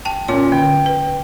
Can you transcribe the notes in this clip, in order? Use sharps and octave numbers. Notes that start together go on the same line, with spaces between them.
G5 A5
A#2 C#4 F4 C#5
D3 G5
B4